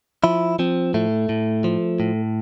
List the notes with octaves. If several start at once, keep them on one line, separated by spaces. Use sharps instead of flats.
F3 E4
F3 C4
A2 A3
A2
F3
A2